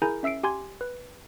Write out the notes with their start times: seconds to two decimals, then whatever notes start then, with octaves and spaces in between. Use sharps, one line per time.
0.02 E4 G#4 A#4 G#5 A#5 G6
0.23 C#4 E5 E6 C7 D7
0.43 G4 G#5 C6 G#6
0.81 B4